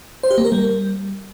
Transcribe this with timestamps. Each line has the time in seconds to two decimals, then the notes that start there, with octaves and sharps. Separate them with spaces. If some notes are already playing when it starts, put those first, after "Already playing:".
0.23 C5
0.31 G4
0.38 A#3
0.45 A#4
0.52 G3